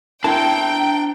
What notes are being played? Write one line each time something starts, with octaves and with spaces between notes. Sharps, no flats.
C4 D4 E4 A#4 G5 A5 A#5